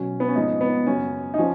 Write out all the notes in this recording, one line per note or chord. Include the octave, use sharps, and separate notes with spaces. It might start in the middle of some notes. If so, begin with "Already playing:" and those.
Already playing: B2 F#3 C#4
B3
C#4
G#2 F3 G#3 D#4
B3
F#2 C#3 F#3 C#4
D#4
F3 C#4